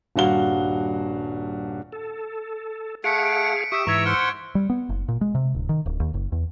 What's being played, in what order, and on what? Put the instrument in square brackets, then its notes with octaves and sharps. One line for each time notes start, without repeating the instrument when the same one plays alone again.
[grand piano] D#1 G2 F#4 F5 G7
[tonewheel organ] A4
[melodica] A3 F#5 [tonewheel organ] G#4 F5 [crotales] B6 C#7 D7
[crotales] D7
[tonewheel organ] G4 [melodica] E5 D#6 [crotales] C#6 E7
[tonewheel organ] G#2 E3 [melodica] E5 A#5 C#6 [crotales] E6 G#6
[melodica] C5 F#5 C6 [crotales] F6
[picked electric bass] G3
B3
F#1
A#2
G#3
C3
D1
D#3
D1
D#2
F#1
E2